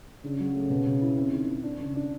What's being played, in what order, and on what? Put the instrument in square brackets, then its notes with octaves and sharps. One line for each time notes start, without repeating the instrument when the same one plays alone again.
[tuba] C#3 [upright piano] D4
[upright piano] F#3
A3
B2
B2
E4
C4
D#3
D#3
D4
C#3
D4